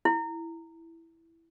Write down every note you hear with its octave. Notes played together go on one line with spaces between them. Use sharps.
E4